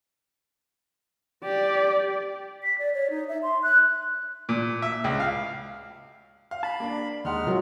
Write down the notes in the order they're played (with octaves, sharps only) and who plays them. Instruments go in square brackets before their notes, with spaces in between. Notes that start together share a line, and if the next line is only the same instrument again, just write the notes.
[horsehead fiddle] G4 D5
[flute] B6
D5
C#5
D#4
E5
C6
F#6
[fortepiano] A#2
E5
C#2
F5
[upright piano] F5
[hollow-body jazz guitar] A5 [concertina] B5
[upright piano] A#3 D4
[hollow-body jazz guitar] D#2 [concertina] G#3 D#4 F6 [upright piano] F#5 C6
[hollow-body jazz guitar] C3 F4 A#4 [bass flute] F#3